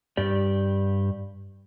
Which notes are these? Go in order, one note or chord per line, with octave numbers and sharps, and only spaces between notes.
G2 G4 D5